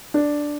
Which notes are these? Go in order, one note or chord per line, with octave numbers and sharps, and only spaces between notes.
D4